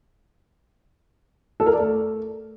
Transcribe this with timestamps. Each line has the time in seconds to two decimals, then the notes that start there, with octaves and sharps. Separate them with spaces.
1.60 A4
1.66 A#4
1.73 D5
1.80 A3